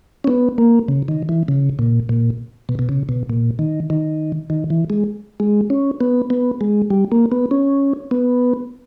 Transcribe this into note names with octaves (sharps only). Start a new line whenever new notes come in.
C#4
B3
A#3
C#3
D#3
E3
C#3
A#2
A#2
B2
B2
C#3
B2
A#2
D#3
D#3
D#3
E3
G#3
G#3
C#4
B3
B3
G#3
G3
A#3
B3
C#4
B3